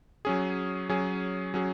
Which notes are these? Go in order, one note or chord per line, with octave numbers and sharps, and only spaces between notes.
F#3 C#4 G#4
F#3 C#4 G#4
F#3 C#4 G#4